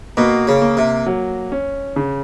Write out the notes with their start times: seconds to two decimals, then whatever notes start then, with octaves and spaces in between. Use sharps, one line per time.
0.17 B2 A#3
0.47 C#3
0.62 A#3
0.77 C3
1.06 F#3
1.52 C#4
1.96 C#3